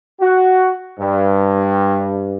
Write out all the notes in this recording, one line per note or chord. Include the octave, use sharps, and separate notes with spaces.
F#4
G2